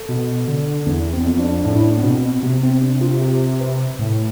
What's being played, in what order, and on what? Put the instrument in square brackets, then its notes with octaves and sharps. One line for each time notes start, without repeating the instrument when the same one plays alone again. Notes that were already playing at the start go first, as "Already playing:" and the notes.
Already playing: [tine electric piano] A4
[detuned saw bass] B2
D3
[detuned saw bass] E2 [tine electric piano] B3
[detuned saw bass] E2 [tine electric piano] C4
[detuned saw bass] F2
[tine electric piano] D4
[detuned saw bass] A2 [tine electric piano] D4
[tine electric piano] E4
D4
B3
[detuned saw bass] B2 [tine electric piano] C4
[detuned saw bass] C3 [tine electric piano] B3
[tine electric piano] C4
D4
F4
G4
B4
[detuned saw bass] A2